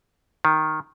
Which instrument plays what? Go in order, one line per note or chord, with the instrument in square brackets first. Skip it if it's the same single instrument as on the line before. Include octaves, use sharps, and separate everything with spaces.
[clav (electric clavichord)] D#3